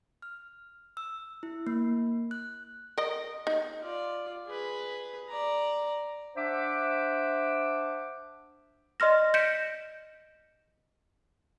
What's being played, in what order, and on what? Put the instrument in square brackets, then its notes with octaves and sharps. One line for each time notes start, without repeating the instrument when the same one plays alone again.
[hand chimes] F6
E6
E4
A#3
F#6
[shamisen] A#4 D#5
D#4
[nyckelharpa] F4 D5
G#4 B4
D5 A#5
[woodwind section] D4 C5 E5 F#5 D6
[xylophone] D5 D#5 C6 F6 A#6
G6 A#6 B6 C#7 D7 E7